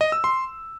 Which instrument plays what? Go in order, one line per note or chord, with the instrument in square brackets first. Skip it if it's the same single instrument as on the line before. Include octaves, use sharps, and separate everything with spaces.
[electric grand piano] D#5
E6
C6